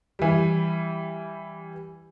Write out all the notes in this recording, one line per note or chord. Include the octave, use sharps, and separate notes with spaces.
E3 G3